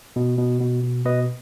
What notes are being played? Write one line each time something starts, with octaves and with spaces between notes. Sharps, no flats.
B2
B2
B2
B2
B2 B4 D#5